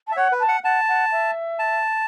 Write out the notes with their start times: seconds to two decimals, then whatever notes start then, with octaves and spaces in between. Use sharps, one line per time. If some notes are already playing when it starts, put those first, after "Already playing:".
0.07 A5
0.12 E5
0.16 C#5 F#5
0.32 B4
0.40 A5
0.48 F#5
0.63 F#5 A5
0.88 F#5
1.12 E5
1.59 A5